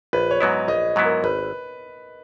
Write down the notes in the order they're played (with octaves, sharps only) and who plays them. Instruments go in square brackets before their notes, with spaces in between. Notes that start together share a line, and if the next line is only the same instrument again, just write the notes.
[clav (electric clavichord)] A#1 [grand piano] B4
[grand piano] C#5
[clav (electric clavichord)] G#2 F#3 B3 E4 [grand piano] D#5
[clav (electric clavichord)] A#1 [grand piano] D#5
[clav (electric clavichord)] G#2 F#3 B3 E4
[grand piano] A#4
[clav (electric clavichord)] G#1 [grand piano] B4